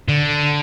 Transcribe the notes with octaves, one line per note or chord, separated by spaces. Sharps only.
D3